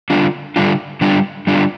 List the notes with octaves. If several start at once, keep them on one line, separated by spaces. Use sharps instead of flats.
D3 G3 D4 F4
D3 G3 D4 F4
D3 G3 D4 F4
D3 G3 D4 F4